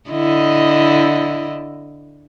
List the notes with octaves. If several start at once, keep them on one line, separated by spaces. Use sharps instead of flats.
D3 E4 D#5